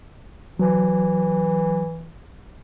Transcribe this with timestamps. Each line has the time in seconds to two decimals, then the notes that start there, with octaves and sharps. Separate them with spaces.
0.59 E3 F#3